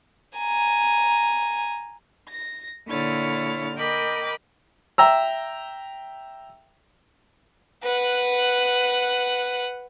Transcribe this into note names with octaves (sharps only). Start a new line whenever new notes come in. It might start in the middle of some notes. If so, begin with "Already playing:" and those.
G#5 A#5
A#6
A#2 D3 E4 C#5 F6 A6
A#4 D#5 G5 B5 D6
E5 G5 A#5 E6
B4 F#5